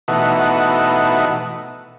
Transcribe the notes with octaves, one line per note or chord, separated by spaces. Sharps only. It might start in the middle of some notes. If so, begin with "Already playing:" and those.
B2 E3 A3 D#4 F#4